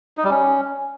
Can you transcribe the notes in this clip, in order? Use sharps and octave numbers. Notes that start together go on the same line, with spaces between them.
D#4
G3
C#4